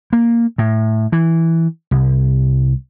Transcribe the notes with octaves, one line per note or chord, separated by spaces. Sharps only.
A#3
A2
E3
C2